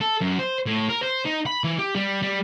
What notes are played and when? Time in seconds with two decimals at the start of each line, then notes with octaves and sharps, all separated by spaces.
0.01 A4
0.21 F#2
0.39 C5
0.66 A2
0.89 A#4
1.03 C5
1.25 D#4
1.46 B5
1.64 E3
1.79 G4
1.96 G3
2.22 G3